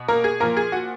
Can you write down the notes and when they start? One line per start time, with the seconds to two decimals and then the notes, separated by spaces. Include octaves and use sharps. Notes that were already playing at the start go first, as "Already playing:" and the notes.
Already playing: B2
0.08 A#3 A#4
0.24 G#4
0.40 A#2 F3 A#3 A#4
0.57 G#4
0.72 F#4